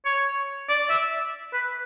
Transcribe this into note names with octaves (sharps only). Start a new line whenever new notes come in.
C#5
D5
E5
B4